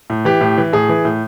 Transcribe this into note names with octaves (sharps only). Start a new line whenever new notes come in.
A2
E3 G4
A2
E3
A2 G#4
E3
A2